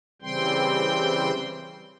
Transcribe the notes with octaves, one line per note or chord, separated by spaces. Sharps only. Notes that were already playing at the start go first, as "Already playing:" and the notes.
C#3 E3 G3 C4 G5 C6